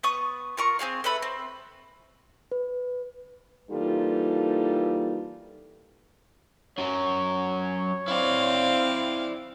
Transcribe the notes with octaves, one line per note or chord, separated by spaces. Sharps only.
B3 C#6 D#6
F4 A#4 C#6
C4 F4 G#4 F5
A4 B4 E5 B5
C4
B4
E3 G3 A#3 D#4 F4 A4
F#2 F#3 C#5
C4 E4 D5 F5